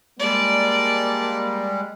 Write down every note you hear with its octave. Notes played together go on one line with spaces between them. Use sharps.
G3 G#3 A#3 D5 A5